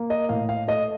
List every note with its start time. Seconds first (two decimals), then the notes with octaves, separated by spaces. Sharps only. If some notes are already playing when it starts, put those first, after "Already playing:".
Already playing: A#3
0.10 D#5
0.29 A2 F5
0.49 F5
0.68 A3 D#5